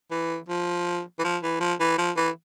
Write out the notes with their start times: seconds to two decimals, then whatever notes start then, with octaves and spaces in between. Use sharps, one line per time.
0.11 E3
0.48 F3
1.19 E3
1.24 F3
1.43 E3
1.60 F3
1.80 E3
1.98 F3
2.16 E3